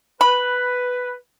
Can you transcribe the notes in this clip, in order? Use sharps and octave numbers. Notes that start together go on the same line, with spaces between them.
B4 B5